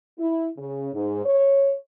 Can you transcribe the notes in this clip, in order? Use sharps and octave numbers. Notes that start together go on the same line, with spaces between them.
E4
C#3
G#2
C#5